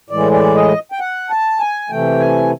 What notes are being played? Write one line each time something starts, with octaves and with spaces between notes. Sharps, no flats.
A2 E3 G#3 D5
D5
D#5
G5
F#5
A5
G#5
C3 E3 A3 G5
G#5